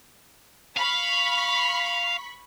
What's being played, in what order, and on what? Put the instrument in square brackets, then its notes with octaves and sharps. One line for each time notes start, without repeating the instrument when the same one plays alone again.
[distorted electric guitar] F5 [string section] B5 C#6 B6